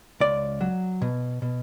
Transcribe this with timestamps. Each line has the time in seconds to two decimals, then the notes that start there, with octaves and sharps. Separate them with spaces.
0.20 C#2 D5
0.61 F#3
1.02 B2
1.42 B2